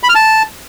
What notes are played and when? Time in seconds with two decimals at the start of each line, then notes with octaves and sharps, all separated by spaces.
0.03 B5
0.09 F6
0.15 A5